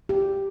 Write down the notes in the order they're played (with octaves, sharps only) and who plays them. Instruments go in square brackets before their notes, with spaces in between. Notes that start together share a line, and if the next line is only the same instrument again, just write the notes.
[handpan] G4